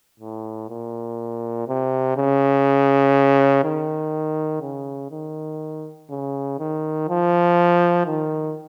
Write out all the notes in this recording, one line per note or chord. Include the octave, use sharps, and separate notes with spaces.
A2
A#2
C3
C#3
D#3
C#3
D#3
C#3
D#3
F3
D#3